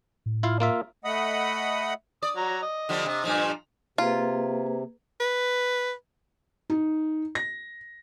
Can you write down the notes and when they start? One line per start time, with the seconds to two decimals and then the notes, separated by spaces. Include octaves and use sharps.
0.26 A2
0.43 E4 F4 F5
0.60 A#3 F4 E5
1.04 A3 D#5 F#5 B5 D#6
2.23 D5 D#6
2.37 F#3 A#5
2.62 D#5
2.89 D3 F3 G3
3.06 C3
3.24 G2 A#2 F3
3.98 C3 A#3 F4 G#4 B4
5.20 B4
6.70 D#4
7.35 A#6